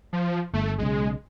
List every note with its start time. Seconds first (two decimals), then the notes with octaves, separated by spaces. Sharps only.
0.13 F3
0.54 G1 A3
0.78 B1 C#3 G#3